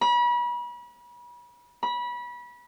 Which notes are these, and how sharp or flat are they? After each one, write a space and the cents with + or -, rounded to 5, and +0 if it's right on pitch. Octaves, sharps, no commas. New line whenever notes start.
B5 -35
B5 -25